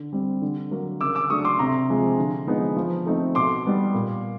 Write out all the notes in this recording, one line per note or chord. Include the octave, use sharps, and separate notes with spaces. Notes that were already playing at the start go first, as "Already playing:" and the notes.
Already playing: D3
G3 C4
D3
F#3 A#3
C#3 D6 E6
D6 E6
F#3 A3 D4 C#6 D#6
C6 D6
C3 A#5 C6
F3 G#3 C4
D3
F3 G#3 B3 D#4
F3
A3 C4 D#4
B2 C6 D6
G3 B3 D#4
A#2